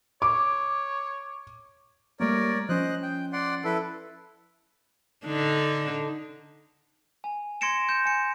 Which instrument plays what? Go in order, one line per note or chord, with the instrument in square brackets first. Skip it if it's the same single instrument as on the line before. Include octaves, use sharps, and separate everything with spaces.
[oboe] C#5 [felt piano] D6
[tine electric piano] G3 A3 A#3 [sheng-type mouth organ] A#4 C#5 D5
[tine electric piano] F3 C#4 [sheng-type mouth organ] C5 D#5 F#6
[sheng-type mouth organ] G5
D5 F#5 C6
E4 A4 B4
[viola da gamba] D3 D4 D#4
[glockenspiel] G#5
C6 G#6 A#6 C#7 D7 E7
G6 E7
G#5 C#7